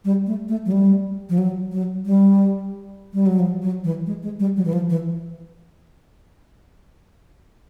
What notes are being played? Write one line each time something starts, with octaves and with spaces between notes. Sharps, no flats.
G3
A3
A3
F#3
G3
F3
F#3
F#3
G3
G3
F#3
F3
F#3
E3
G#3
G#3
G3
F#3
E3
F3
E3